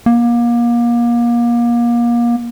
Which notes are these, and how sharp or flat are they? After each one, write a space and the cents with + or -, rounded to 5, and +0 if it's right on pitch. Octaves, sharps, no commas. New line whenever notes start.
A#3 +30